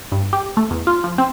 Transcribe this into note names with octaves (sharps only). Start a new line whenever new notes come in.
G2
G4
A3
E2
F4
F3
C4